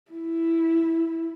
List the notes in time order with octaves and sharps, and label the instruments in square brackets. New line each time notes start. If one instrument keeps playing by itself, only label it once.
[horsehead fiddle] E4